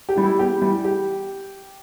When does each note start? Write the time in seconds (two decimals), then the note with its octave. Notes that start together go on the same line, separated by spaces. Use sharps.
0.09 G4
0.16 E3 G3
0.24 E4
0.39 E2 G4
0.62 E3 G3
0.84 G4